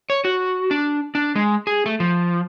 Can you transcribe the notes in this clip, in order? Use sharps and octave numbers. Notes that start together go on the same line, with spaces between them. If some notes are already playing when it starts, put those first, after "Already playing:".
C#5
F#4
D4
D4
G#3
G#4
A3
F3